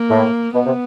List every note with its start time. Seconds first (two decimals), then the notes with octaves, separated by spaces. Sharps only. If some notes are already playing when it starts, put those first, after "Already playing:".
Already playing: A#3
0.10 A2
0.54 B2 B3
0.66 C3